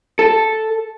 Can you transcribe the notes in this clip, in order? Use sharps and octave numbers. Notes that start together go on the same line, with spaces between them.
A4